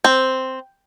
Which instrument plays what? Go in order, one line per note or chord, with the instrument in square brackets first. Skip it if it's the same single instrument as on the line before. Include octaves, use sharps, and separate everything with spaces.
[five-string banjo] C4